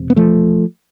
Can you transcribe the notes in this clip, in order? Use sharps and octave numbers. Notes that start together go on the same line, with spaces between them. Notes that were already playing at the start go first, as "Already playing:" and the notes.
Already playing: E1 C3
B3
F3 A3